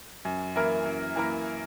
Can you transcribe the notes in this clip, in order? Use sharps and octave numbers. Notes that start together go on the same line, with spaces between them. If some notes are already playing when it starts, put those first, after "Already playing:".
F#2
E3 A#3 E4 A#4
F#2
E3 A#3 E4 A#4